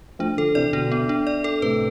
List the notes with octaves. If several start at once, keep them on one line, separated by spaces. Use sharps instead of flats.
F3 A3 D4
D3 F3 A4
C3 E3 D5
B2 D3 D4
B3
D4
D5
A4
A2 C3 B4